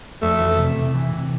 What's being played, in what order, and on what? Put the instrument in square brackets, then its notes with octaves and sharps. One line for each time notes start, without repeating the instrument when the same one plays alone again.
[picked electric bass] F2 [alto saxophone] A3
[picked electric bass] E3
C3
C3
E3
C3